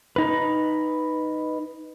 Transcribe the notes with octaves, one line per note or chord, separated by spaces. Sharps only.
D#4 B4